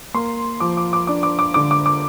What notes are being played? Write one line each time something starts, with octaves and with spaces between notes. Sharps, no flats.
A#3 C6
F3 D6
D6
D6
D4 D6
D6
D6
D3 D6
D6
D6